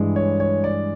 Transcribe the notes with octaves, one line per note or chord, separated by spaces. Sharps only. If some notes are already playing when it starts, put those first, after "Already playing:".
Already playing: G2 E3 G#3
C#5
C#5
D5